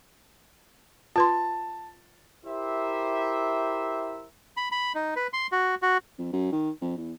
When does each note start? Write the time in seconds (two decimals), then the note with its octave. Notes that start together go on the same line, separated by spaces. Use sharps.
1.16 F4 B4 A5 C6
2.46 E4 G4 A#4 C5 E5
4.57 B5
4.72 B5
4.95 D#4
5.16 B4
5.33 C6
5.52 F#4
5.82 F#4
6.18 F2
6.33 F#2
6.52 D#3
6.81 F2
6.97 E2